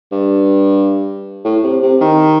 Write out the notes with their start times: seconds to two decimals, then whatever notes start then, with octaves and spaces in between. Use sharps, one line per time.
0.12 G2
1.44 A2
1.64 C3
1.82 C3
2.01 D#3